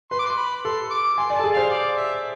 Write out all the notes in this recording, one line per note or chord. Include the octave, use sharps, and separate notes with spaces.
B4 C6
D6
C6
B5
A4 C6
D6
G#5 C6
D5
A4 A5
G#4
C5 F5
D5
E5